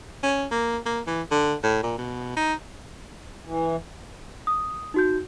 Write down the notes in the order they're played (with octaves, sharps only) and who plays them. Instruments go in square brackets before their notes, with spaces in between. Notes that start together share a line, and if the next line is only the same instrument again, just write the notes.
[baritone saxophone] C#4
A#3
A#3
E3
D3
A2
A#2
B2
D#4
[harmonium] E3
[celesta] D#6
D#4 F#4 G6